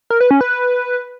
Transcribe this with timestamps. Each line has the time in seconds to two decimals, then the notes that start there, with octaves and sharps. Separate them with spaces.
0.10 A#4
0.20 B4
0.31 C#4
0.41 B4